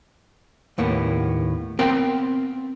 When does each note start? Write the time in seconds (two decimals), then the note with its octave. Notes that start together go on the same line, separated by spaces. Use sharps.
0.78 D#2 A2 A#3 B3
1.79 B3 C4 A#4 F5 G5